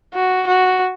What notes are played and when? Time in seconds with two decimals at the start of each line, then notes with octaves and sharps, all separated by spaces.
0.14 F#4
0.47 F#4